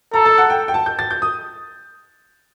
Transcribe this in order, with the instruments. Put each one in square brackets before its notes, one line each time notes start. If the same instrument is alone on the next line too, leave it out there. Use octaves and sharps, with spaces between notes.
[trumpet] A4 [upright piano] A#5
[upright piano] A5
F#5
G5
G5
A5
G6
A6
G6
D#6